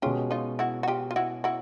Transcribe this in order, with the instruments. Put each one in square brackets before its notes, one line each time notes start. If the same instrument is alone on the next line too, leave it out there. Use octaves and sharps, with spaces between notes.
[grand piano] B2 G#3 C#4 [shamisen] F4 G4
[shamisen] D#4 F4
E4 F#4
F#4
F4 G4
F4
E4 F#4
E4 F#4